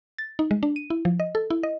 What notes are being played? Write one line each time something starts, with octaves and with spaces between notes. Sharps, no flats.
A6
D#4
G#3
D4
D#7
E4
F3
D#5
A4
E4
D#5